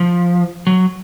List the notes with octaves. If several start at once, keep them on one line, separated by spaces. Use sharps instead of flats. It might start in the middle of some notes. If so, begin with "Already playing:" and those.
Already playing: F3
F#3